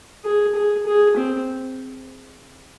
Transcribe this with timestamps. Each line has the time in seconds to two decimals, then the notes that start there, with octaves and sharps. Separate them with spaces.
0.24 G#4
0.55 G#4
0.86 G#4
1.17 C4